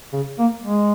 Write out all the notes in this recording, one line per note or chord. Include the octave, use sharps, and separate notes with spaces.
C#3
A#3
G#3